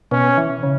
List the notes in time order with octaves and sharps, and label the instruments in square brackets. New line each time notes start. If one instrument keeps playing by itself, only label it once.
[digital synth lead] B2 [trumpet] C#4
[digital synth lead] E3
C#3